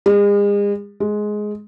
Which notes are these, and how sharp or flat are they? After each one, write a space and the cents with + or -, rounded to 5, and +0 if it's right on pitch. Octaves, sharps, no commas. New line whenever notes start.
G#3 -40
G#3 +10